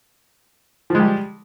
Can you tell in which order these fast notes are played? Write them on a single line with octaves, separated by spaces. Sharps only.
F3 G#3 G3